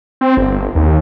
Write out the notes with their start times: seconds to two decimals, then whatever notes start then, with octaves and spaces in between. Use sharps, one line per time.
0.21 C4
0.37 G1
0.75 D#2